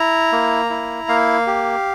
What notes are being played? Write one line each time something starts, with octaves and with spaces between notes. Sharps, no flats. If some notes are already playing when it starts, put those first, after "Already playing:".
Already playing: E4 A#5
A#3
E4
A#3 F5
G4